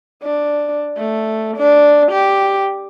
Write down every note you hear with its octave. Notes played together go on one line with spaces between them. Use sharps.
D4
A3
D4
G4